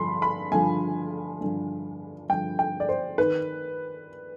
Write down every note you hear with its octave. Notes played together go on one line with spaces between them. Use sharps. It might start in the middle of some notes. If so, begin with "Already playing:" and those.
Already playing: G2 D3 F3 B5 C6
B5
G2 D3 F3 G#5
G2 D3 F3
G2 D3 F3 G5
G5
D5
C5
D#3 B4